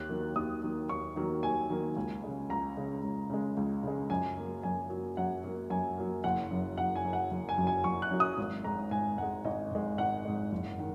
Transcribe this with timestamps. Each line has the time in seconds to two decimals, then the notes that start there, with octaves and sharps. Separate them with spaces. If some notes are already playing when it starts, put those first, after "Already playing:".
Already playing: D#2 F#6
0.09 D#3 F#3 A#3
0.36 D#2 D#6
0.63 D#3 F#3 A#3
0.89 D#2 C#6
1.16 D#3 F#3 A#3
1.43 D#2 G#5
1.70 D#3 F#3 A#3
1.96 C#2
2.23 C#3 G#3
2.50 C#2 A#5
2.77 C#3 G#3
3.04 C#2
3.30 C#3 G#3
3.57 C#2
3.83 C#3 G#3
4.10 F#2 G#5
4.37 F#3 A#3
4.63 F#2 G#5
4.90 F#3 A#3
5.17 F#2 F#5
5.44 F#3 A#3
5.70 F#2 G#5
5.98 F#3 A#3
6.24 F#1 F#5
6.51 F#2 F#3
6.77 F#1 F#5
6.96 G#5
7.05 F#2 F#3
7.13 F#5
7.31 F#1
7.49 G#5
7.57 F#2 F#3
7.67 G#5
7.84 F#1 C#6
8.02 F#6
8.11 F#2 F#3
8.20 D#6
8.38 G#1
8.64 G#2 G#3 A#5
8.91 G#1 G#5
9.18 G#2 G#3 F#5
9.45 G#1 D#5
9.71 G#2 G#3
9.98 G#1 F#5
10.25 G#2 G#3
10.52 F#1
10.79 D#3